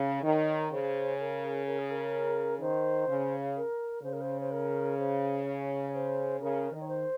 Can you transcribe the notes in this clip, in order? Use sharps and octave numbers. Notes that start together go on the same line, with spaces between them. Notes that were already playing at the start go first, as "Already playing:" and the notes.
Already playing: C#3
D#3 C#5
C#3 C5
A#4
A#4
G#4
A#4
D#3 C5
C#3
A#4
C#3 C5
A#4
C5
C5
A#4
C5
C#5
C5
C#3 A#4
D#3 D#5
C#5
C5